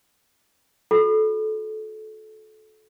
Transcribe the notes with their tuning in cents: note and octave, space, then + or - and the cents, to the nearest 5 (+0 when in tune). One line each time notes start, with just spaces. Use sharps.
F#4 -40 A4 -25